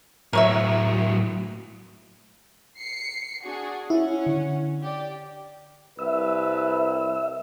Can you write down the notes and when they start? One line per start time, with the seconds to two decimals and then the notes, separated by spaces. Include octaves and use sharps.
0.33 A2 F#3 A#4 C#5 E5
2.78 C7 C#7
3.44 D4 F#4 G#4
3.90 C#4 E4 F#5
4.26 D3
4.82 G4 D5
5.99 C2 B4 E5